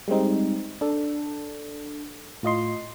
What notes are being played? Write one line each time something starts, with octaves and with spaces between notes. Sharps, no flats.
G3 G#3 C4 D#4
D4 A4
A2 F4 D#5 C6